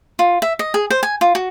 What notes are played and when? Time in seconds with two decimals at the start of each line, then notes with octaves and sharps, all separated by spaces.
0.19 F4
0.42 E5
0.59 D#5
0.74 G#4
0.90 C5
1.03 G#5
1.21 F4
1.35 F#4